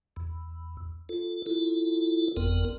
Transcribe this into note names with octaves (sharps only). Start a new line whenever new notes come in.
E2
F4 A4
E4 F4 A4
G1 F2 B3 A#4